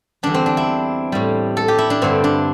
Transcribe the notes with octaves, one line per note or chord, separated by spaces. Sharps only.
E2 D3 G3 D4
C4
D4
E4
A2 G3
A4
G4
E4
D4
G2 D3 G3 C4
D4